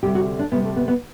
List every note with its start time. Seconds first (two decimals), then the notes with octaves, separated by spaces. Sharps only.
0.03 D2 C3 G3 G4
0.15 F#4
0.39 D4
0.51 D2 C3 G3 B3
0.64 A3
0.76 B3
0.88 B3